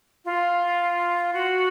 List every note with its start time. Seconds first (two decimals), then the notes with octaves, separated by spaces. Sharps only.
0.25 F4
1.33 F#4